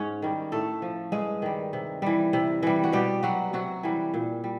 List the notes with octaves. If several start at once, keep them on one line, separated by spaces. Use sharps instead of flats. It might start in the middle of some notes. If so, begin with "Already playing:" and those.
Already playing: G#2 C#4 C#5
D#3 G3
A2 A3 A4
F3
G2 G#3 G#4
D#3 G3
C3
E3 G3
C3
E3 G3
F#4
B2 G3 G4
F#3 G3 F#4
C3 F#3 F#4
E3 G3
A#2
G3